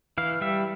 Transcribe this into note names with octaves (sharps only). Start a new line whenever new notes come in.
E3 F5
G3 E5